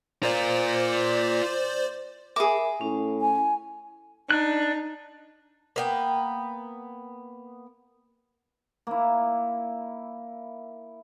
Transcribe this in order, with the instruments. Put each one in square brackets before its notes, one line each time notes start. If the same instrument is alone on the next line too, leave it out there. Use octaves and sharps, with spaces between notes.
[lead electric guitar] F4 A#4 [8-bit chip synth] C5 D5
[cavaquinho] G#4 D6 [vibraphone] A#4 E5 B5
[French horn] A2 [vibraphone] C#4
[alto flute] G#5
[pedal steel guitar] D4 F#6 [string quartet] D#4
[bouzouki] A#3 B3 G5
[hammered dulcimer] A#3 E4